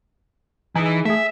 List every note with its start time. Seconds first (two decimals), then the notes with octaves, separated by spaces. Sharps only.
0.75 E3 D#4 G#4
1.05 A3 G#4 E5